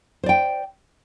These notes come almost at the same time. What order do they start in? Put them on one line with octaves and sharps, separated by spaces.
C5 D5 G5